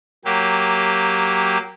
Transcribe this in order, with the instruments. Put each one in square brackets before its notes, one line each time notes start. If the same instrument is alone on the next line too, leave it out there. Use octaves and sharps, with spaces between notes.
[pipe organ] F#3 A#3 G4